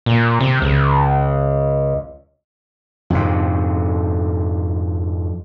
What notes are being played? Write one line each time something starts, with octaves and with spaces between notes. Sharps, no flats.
A#2
C3
C#2
F2 G#2 C3